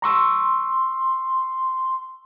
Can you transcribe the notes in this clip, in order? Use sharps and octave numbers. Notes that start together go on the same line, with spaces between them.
A#5 C6 C#6 E6